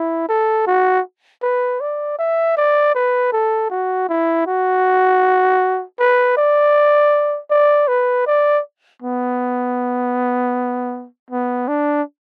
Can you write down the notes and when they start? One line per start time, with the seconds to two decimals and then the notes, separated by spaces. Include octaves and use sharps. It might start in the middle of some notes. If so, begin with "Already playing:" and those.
Already playing: E4
0.29 A4
0.67 F#4
1.43 B4
1.81 D5
2.19 E5
2.57 D5
2.95 B4
3.33 A4
3.70 F#4
4.09 E4
4.47 F#4
5.99 B4
6.37 D5
7.51 D5
7.88 B4
8.27 D5
9.02 B3
11.31 B3
11.68 D4